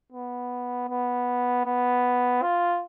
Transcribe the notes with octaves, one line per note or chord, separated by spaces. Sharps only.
B3
B3
B3
F4